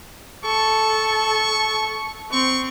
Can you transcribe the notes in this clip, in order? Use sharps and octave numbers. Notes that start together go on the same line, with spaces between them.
A4 C#6
C4 C#6